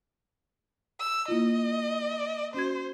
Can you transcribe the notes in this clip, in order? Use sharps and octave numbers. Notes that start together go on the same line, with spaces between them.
E6
A#3 E4 F4 D#5
C#4 F#4 C5 G#6